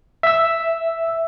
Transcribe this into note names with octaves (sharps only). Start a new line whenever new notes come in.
E5 E6